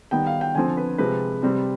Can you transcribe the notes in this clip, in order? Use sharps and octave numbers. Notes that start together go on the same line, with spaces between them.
D#3 G3 B3 G5
F5
G5
D3 F3 C4 G#5
B4
C3 F3 G#3 C4 B4
C3 G3 C4